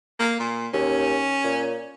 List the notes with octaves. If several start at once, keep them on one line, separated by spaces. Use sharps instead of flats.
A#3
A#2
D#2 C#4
A#2